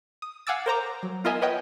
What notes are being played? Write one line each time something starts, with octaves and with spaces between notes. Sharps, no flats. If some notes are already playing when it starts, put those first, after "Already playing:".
D#6
F5 F#5 G#5 D6 E6 A6
A#4 C5 A#5 D6
F#3
B3 F4 A#4 D#5 E5 G#5
B4 C#5 D#5 F#5 G5 D#6